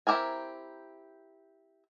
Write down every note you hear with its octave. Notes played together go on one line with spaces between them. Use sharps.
C4 E4 G4 A#4 G#5